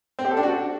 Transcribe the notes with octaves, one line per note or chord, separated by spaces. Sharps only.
C4
G4
A4
D4
F#4